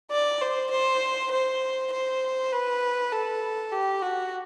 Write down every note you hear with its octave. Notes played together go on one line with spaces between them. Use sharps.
D5
C5
C5
C5
C5
B4
A4
G4
F#4